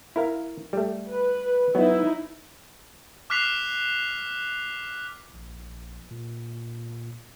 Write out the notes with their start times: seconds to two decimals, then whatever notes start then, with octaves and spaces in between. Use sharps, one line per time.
0.16 E4 A#4 F5
0.73 G3 A3
1.09 B4
1.75 F#3 B3 D#4 E4
3.30 D6 F6 F#6 B6 C7 F7
5.33 A#1
6.11 A#2